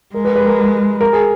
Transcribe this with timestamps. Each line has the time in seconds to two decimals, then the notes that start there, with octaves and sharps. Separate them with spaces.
0.14 G#3 A#4
0.25 B4
0.36 B4
0.46 A#4
1.01 A#4
1.13 G#4